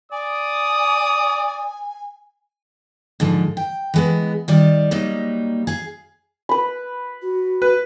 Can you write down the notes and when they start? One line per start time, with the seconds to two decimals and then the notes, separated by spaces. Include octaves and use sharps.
0.12 D5 G#5 D#6
3.20 G#2 D3 F3
3.57 G5
3.94 E3 G#3 B3
4.48 D#3 G3 D5
4.91 F#3 G3 A#3 D#4
5.67 G#4 F5
6.49 B4 B5
7.22 F#4
7.62 B4